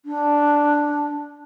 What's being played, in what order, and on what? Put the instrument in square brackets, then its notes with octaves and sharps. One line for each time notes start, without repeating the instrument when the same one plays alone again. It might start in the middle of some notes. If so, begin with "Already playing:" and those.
[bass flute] D4